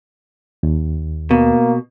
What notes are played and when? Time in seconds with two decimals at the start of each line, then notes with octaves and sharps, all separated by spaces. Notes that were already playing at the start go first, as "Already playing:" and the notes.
0.63 D#2
1.31 B2 A#3